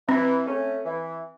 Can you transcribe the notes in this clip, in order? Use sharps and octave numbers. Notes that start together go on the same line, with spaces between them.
E3 C4
A3 C#4
E3